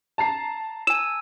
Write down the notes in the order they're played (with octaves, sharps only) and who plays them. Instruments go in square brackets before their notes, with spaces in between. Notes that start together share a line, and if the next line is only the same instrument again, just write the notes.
[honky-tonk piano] A5 A#5 C7
[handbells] G#5 E6 [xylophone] E7